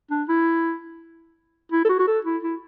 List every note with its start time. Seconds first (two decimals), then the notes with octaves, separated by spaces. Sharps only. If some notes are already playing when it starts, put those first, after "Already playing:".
0.10 D4
0.29 E4
1.72 E4
1.85 A4
1.89 F#4
1.99 F#4
2.07 A4
2.25 E4
2.43 E4